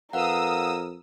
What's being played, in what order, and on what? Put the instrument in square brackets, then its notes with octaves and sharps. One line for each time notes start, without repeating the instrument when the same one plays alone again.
[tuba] F2 [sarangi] A#4 [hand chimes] B4 F5 F#5 [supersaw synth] D#6 E6